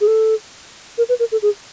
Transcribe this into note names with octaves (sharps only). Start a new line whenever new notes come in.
G#4
A4
A#4
B4
A#4
A4
G#4